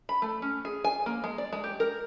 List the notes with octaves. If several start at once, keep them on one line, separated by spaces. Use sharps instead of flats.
B5
A3
C#4
G#4
G#5
A#3
G#3
D5
G#3
G4
A#4